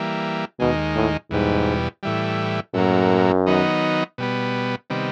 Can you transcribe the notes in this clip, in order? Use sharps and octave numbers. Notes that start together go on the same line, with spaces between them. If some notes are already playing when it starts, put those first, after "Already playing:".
Already playing: E3 G3 A#3
D#2 B2 D#3 G#3
A2
E2 G#2 B2 G3
A2 E3 G3
F#2 A2 F#3 A#3
D#3 F#3 B3 D#4
B2 G3 B3
C3 D#3 G3 B3